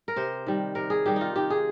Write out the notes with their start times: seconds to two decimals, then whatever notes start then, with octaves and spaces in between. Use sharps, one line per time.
0.08 A#4
0.16 C3 C5
0.46 D#3 G3
0.75 C3 A#4
0.90 G#4
1.05 D#3 G3 G4
1.16 D#4 F4
1.36 D#3 G4
1.50 G#4